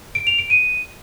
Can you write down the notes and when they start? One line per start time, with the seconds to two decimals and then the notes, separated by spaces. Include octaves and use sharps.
0.15 D7
0.27 F7
0.38 D7
0.50 D#7